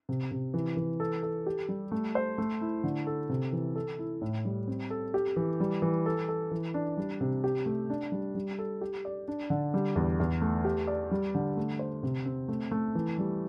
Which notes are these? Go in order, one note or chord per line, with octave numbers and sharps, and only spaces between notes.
C3
C3
E3
E3
A4
A4
G4
G3
A3
C5
A3
E4
D3
A4
C3
E3
A4
E4
A2
G3
C4
A4
G4
E3
G3
E3
A4
A4
E3
D4
G3
C3
G4
A3
D4
G3
G3
A4
G4
D5
D4
D3
G3
E2
E2
A3
G4
D5
G3
D3
A3
C5
C3
C4
A3
A3
E3
G3